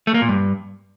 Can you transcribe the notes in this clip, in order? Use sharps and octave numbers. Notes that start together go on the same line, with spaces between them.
A3
A#3
A#2
G2